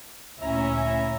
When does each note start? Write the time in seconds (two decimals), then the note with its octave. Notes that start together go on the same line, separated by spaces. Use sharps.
0.42 D2 A#2 C#4 E4 E5 A#5